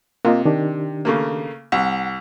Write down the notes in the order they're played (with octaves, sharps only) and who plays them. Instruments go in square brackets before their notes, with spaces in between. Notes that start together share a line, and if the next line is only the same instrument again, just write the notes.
[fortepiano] C3 [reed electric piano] A#3 F4 D#5
[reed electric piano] D#3 D4 G4
[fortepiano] C#3 A3 A#3
[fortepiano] C2 [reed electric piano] F#5